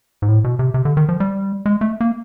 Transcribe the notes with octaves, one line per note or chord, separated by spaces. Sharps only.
G#2
A2
B2
C3
C3
D3
D#3
F3
G3
G#3
A3
A#3